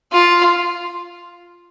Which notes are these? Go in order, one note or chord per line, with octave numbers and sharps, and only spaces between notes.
F4